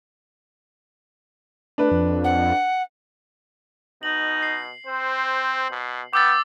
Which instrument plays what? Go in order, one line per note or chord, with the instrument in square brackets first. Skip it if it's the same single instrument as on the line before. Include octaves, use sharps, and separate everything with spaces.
[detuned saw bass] A3 [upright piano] D4 B4
[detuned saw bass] F2
[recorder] F#5
[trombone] B2 [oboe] D#4 [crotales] F#7
[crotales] C7
[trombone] C4 [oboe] C5
[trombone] B2
[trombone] B3 [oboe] G5 [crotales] D6 E6 A6